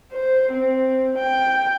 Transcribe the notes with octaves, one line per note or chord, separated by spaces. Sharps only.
C5
C4
G5